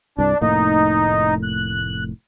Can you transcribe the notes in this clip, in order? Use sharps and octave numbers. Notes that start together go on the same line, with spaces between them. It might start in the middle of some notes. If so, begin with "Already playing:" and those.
C2 G2 D4
F1 A2 A#3 D#4
F#6